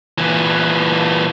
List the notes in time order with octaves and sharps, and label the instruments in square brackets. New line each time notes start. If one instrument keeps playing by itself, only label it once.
[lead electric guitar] A#2 E3